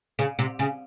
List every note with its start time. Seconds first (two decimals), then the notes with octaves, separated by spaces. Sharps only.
0.19 C#3
0.39 C3
0.59 C#3